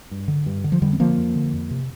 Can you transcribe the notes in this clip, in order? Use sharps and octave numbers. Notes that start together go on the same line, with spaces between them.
G2
D3
G2
D3
F3
F2 D3 G3
C4
D3 F3 A#3
F2
D3
F2
C3